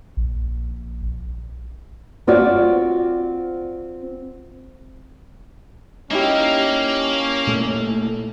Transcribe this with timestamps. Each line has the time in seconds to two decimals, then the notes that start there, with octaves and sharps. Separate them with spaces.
0.17 A#1
2.27 C4 F4 F#4 D5
6.10 A#3 C#4 D#4 E4 G4
7.47 A#2 A3